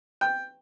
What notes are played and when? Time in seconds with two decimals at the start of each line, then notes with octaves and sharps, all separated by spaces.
0.21 G5